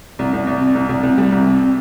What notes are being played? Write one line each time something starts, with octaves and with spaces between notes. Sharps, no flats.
C2
C2
C2
C3
C2
C2
C2
G3
C2
C3